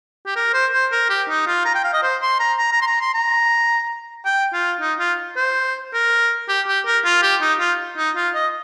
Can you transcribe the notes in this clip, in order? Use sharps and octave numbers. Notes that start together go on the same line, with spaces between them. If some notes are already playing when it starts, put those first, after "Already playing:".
G4
A#4
C5
C5
A#4
G4
D#4
F4
A#5
G5
F5
D#5
C5
C6
A#5
A#5
A#5
C6
A#5
C6
A#5
G5
F4
D#4
F4
C5
A#4
G4
G4
A#4
F4
G4
D#4
F4
D#4
F4
D#5